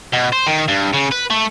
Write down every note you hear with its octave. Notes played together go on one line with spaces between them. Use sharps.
B2
C5
D#3
G2
C#3
B4
A3